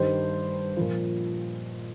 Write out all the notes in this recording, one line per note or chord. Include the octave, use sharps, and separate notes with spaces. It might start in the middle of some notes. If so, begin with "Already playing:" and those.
Already playing: G2 D#3 G3 C5
A#2 F3